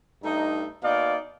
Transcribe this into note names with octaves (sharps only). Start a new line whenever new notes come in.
G2 A3 D#4
B2 A#3 D#4 D5 F5